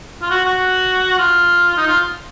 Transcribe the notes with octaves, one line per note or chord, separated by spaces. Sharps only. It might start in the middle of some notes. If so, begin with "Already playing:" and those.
F4
F#4
F#4
F4
D#4
F4